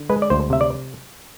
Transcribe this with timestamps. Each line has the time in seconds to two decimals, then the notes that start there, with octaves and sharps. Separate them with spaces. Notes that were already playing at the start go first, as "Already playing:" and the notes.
Already playing: D3
0.09 G#3 B4
0.22 D5
0.30 D2 C5
0.50 C3 E5
0.61 D5